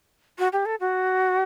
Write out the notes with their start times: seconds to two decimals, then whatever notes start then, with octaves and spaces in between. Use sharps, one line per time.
0.39 F#4
0.53 G4
0.66 A4
0.80 F#4